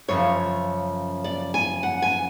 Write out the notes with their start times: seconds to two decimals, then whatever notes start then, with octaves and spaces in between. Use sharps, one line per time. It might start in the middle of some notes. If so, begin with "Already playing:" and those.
0.08 F#2 C#3 F3 C#5
1.24 D5
1.54 G#5
1.83 F#5
2.02 G#5